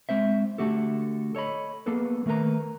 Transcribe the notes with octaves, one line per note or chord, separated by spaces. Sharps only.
G#3 C4 C5 E5
D3 A3 F#4 G4 A4
A4 C#5 D#5 B5
A#3 B3 G#4 A4 B4
D#3 A3 A#4 B4 A#5